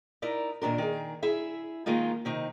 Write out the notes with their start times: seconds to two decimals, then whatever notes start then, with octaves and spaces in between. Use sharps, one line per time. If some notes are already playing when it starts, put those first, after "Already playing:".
0.22 D#4 E4 A#4 D5
0.62 A#2 D#3 D4 A#4
0.78 D#3 G#4
1.23 E4 G#4 E5
1.86 D#3 G#3 A#3 D#4 F4
2.25 C3 D#3 D#4